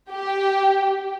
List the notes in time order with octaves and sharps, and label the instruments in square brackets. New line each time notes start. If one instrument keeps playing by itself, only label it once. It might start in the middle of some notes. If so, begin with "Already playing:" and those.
[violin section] G4